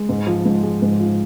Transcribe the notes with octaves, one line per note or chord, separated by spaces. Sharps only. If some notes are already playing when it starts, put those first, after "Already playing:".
Already playing: G#3
G#2
F3
G#2
G#3
G#2
F3